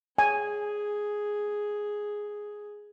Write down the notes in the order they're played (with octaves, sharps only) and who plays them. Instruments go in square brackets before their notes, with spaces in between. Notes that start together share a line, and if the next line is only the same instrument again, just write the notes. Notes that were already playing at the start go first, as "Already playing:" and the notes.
[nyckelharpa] G#4 [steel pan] G#5